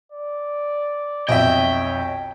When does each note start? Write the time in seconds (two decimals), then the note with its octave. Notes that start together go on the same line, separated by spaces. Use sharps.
0.12 D5
1.29 B1 F2 C#5 D#5 E5 G5